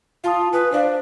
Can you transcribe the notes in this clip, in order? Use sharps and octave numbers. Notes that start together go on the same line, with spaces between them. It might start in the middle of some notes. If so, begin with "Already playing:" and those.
F4 F5 A5 D#6
B4 G#5 D#6
D4 C5 F5